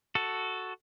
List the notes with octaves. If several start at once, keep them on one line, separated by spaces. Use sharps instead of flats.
F#4 A4